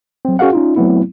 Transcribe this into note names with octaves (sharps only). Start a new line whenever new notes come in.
F#3 C4
C#4 F#4 G#4 A#4 F5 F#5
C#4 D#4 F4
F#3 A3 B3 C4 E4